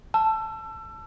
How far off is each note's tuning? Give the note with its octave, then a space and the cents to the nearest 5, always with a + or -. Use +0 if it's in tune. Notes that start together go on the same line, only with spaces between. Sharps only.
A5 +0 E6 +30